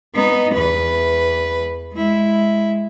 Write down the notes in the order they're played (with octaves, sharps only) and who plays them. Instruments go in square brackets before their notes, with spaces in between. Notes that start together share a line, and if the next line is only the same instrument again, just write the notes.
[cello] B3 D#4
E2 B4
G#3 E4